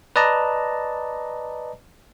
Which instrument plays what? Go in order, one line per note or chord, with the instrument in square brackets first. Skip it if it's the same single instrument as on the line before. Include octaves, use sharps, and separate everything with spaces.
[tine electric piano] B4 D5 D#5 A5 A#5